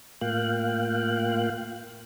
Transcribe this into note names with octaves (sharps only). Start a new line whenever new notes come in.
A2 A#3 F4 F5 G5 F#6